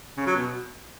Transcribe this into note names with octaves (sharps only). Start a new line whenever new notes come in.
C#3
F#3
B2